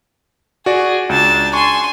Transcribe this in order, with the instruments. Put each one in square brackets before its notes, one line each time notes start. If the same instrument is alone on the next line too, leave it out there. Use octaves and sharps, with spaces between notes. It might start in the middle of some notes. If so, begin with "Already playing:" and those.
[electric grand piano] F#4 D5 [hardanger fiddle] G#4
[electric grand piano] C#2 [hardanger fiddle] D4 A5
[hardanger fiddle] G#5 C6 [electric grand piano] C#6